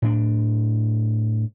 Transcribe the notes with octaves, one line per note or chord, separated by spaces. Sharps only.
A2 D4